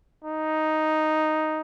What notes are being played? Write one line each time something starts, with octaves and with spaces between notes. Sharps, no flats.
D#4